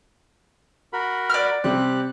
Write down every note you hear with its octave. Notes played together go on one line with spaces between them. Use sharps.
F#4 A#4 B5
D5 F6
C3 G3 C4 G4 F#6